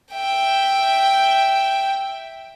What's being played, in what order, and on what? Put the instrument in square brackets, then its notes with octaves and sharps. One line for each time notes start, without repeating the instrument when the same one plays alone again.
[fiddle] E5 G5